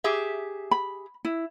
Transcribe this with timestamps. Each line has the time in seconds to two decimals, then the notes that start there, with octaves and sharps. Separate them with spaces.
0.04 G4 G#4 E5
0.71 B5
1.25 E4